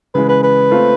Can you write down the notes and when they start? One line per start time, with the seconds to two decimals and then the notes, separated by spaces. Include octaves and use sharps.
0.14 C#3 E3 G#3 B4
0.29 B4
0.43 B4
0.71 A3 C4 F4